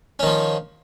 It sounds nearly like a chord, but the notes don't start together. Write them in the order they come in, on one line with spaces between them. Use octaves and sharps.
C#4 D#3 F3